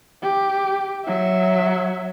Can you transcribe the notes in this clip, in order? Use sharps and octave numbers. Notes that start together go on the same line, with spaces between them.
G4
F#3 E5